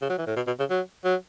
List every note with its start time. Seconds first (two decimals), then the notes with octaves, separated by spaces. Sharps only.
0.02 C#3
0.10 F#3
0.18 E3
0.27 A2
0.36 B2
0.47 B2
0.59 C#3
0.70 F#3
1.05 F#3